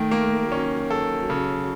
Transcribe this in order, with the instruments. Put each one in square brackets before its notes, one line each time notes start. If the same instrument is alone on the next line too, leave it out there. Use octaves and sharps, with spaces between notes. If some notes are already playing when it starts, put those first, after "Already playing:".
Already playing: [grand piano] D#3 [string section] A3
[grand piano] A#3
[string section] F#3 [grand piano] C#4
[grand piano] A4
C#3